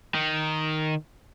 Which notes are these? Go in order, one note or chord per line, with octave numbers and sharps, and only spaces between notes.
D#3